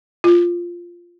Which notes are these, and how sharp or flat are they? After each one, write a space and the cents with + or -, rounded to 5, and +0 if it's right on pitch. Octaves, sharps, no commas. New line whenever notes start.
F4 -5